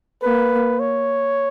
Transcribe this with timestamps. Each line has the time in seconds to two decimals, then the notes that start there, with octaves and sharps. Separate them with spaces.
0.23 A#3 B4
0.80 C#5